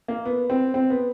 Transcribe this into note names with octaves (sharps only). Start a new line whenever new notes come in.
A#3
B3
C4
C4
B3